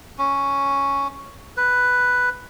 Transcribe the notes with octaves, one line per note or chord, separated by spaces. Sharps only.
C#4
B4